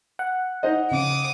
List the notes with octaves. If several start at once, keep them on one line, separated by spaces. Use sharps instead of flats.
F#5
D#4 C5 D#5
C#3 D6 D#6